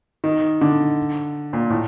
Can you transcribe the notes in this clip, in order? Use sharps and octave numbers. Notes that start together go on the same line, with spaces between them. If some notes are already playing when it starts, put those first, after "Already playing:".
D#3
D3
A#2
A2